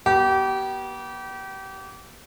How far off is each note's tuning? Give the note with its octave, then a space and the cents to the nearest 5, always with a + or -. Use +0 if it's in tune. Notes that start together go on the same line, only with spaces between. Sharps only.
B3 -40 G4 -30